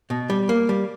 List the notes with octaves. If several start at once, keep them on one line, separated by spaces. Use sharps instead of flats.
B2
G3
A#3
G3